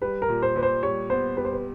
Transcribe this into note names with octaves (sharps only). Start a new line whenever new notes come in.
G3 B4
A#4
A#2
C5
A#2 B4
C5
G3 C#5
B3 C5
G3 B4
C5
B4